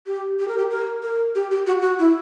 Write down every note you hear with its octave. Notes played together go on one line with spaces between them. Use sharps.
G4
G4
A#4
G4
A#4
A#4
G4
G4
F#4
F#4
E4